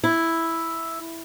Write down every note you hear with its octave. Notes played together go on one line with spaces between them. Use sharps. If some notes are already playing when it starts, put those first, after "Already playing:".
E4